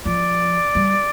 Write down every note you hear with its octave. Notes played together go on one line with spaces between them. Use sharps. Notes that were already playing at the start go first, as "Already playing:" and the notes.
F3 D5
G3